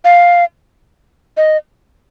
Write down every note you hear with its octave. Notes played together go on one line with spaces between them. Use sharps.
F5
D#5